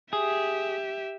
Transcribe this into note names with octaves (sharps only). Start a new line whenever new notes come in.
G4 G#4 E5